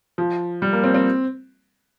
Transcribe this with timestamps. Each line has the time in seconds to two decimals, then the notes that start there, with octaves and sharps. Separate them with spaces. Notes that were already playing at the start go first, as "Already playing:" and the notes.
0.18 F3
0.62 G3
0.73 A#3
0.84 C4
0.94 C4